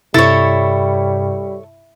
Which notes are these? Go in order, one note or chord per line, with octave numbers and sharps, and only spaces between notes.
G2 C3 G3 E4 A4 C#5